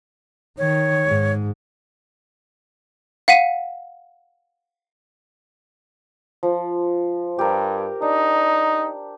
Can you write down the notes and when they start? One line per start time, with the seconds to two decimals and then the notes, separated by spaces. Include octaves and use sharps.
0.58 D#3 C#5
1.07 G#2
3.28 F5 F#5 B6 D#7
6.43 F3
7.39 G2 G4 A#4
8.02 D4 D#4